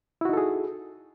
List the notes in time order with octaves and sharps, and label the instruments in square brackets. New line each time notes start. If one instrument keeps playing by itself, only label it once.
[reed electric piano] E4
F#4
D#4
A4
G#4